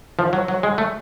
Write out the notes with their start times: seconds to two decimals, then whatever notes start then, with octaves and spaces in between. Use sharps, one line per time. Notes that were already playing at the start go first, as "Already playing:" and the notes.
0.19 F3
0.33 F#3
0.48 F#3
0.63 G#3
0.78 A3